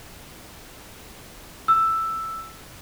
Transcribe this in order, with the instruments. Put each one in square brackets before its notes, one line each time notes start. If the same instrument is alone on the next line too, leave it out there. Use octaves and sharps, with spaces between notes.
[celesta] E6